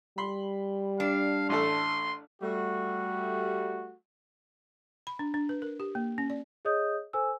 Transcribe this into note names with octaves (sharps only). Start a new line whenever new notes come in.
G3 B5 C6
D4 F5
A1 A3 A4 C6
G3 A3 F#4
B5
D4
D4
B4
A#4
G4
A#3
C#4
D5
G#4 C#5 D#5 D#6 G6
A4 C5 G#5 E6